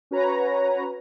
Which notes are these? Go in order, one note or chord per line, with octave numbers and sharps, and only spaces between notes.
C#4 F#4 B4 C#5 A#5